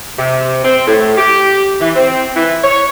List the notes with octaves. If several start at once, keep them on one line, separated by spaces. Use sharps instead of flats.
C3
C4
A2
G4
E3
C4
E3
C#5